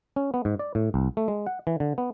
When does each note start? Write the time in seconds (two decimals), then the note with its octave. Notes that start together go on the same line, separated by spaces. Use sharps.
0.16 C#4
0.34 B3
0.45 G#2
0.59 D5
0.75 A2
0.94 C2
1.17 A3
1.28 G#3
1.47 F#5
1.67 E3
1.80 D3
1.98 B3